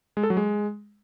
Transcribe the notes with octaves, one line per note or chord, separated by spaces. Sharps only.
G#3
A4
F#3
G#3